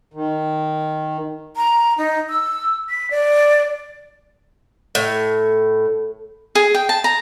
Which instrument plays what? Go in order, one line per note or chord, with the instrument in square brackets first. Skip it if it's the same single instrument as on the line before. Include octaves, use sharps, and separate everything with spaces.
[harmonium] D#3
[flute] A#5
D#4
E6
B6
D5
[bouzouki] A2
[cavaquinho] G#4
G5
A5
A#5